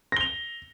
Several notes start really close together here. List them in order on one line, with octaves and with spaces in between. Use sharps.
A#6 G7 F7